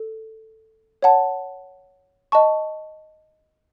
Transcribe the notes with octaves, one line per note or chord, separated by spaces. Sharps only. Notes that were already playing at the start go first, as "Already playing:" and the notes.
Already playing: A4
C#5 F#5 A5
D#5 A5 C#6